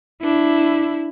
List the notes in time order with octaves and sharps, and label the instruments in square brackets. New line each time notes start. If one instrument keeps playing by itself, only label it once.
[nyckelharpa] D4 [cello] E4